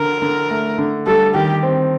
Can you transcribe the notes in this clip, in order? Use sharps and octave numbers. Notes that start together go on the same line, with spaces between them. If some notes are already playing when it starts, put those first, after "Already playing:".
Already playing: D3 A#4
D3
A3
D3
G3 A4
D#3 G4
C4